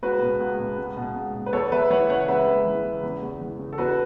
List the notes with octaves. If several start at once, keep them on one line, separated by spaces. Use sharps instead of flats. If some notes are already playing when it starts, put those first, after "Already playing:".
C#2 F#4 B4
B2
C#2
B2
C#2
B2
C#2
B2
B4
E2 A4 C#5
E2 B4 E5
E3 C#5 F#5
C#3 C#5 F#5
F#5
C#2 B4 E5
C#2
E3
C#3
E2
E2
E3
C#3
A4
E2 F#4 B4